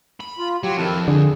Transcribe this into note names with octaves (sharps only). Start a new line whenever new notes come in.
B5
F4
F#3 G4
F2 D#3 E4 A5
D3 G#4